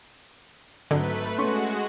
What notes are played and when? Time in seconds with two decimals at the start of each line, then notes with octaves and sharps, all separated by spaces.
0.91 G#1 D3 F#3 A3 B4
1.38 G#3 A3 B3 C#4 F#4 C6 C#6